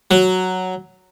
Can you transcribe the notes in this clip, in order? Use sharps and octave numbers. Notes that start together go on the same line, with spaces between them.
F#3